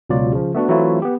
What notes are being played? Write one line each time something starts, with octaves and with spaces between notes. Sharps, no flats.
C#2 B2 F#3 F4 D5
C#3 F3
A3 B3 D4 F#4
E3 F#3 A3 C4 E4 F4
B3 G4